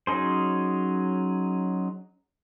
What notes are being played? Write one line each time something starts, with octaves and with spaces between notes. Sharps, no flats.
F#3 C#4 D#4 G#4 C5